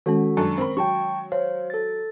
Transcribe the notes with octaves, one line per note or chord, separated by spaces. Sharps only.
D#3 G#3 C#4 F#4 A4
F#2 D4 A4 C#6
C4 A#4 B5
F#3 G5 A5 C#6
C5 C#5 F5
A4 A6